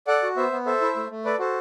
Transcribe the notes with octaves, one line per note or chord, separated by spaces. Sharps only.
A4 D5 F#5
F#4
B3 C5 E5
B3
A4 C5 E5
E4
A3
A3
A4 B4 D5
F#4 A4 C5